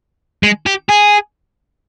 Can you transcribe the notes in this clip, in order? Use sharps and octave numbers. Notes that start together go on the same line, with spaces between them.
G#3
G4
G#4